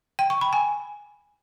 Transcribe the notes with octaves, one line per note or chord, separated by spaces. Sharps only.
G5
C#6
B5
G#5